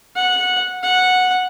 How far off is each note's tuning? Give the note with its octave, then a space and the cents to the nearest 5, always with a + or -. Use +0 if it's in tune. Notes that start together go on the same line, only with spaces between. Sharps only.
F#5 -15
F#5 -10